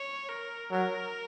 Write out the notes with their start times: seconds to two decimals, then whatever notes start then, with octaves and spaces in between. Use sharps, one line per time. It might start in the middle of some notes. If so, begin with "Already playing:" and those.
Already playing: C#5
0.29 A#4
0.71 F#3 A#4